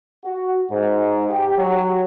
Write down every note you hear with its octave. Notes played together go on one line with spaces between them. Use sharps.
F#4
G#2
G4
F#3